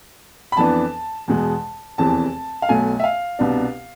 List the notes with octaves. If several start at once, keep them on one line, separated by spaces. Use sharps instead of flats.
B5
F2 E3 B3 D4 A5
E2 B2 G#3
F1 E2 C3 E3 A5
F5
B1 B2 A3 G#5
E5
F5
C2 B2 B3 D4